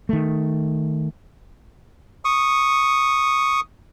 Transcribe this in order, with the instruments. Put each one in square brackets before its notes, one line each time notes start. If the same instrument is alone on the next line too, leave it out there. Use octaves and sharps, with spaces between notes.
[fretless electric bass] D#3 A3
[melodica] C#6 D#6